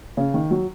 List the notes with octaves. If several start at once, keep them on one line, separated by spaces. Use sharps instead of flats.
C#3
D#3
F#3